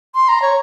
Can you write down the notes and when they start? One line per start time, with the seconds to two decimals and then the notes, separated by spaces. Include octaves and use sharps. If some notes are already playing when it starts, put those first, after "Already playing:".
0.15 C6
0.29 A#5
0.42 C#5